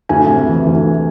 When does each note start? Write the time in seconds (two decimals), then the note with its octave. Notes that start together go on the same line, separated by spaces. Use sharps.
0.09 D2 G#5
0.28 C3
0.47 E3
0.67 D2